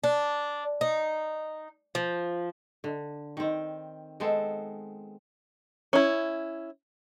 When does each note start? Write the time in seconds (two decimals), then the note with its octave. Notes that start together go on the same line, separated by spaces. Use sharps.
0.04 D4
0.81 D#4
1.95 F3
2.84 D3
3.37 D#3 C4
4.20 G#3 B3 C4 A4
5.93 C#4 E4